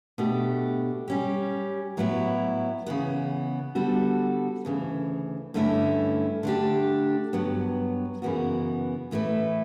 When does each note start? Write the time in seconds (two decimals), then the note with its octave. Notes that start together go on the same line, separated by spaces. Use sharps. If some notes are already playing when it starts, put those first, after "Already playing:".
0.18 B2 A3 D4 G4
1.08 G3 C#4 G4
1.97 A2 F#3 B3 E4
2.86 C#3 E3 B3
3.75 D3 G3 B3 F#4 A4
4.65 D2 C#3 E3
5.54 G2 D3 A3 C#4 E4
6.43 D3 A3 D4 G4
7.33 G2 F#3 B3
8.22 F#2 C#3 E3 B3 F#4
9.11 A2 E3 A3 E4 B4